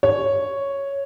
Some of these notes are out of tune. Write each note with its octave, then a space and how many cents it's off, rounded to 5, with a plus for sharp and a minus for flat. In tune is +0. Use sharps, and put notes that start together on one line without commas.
C#5 +0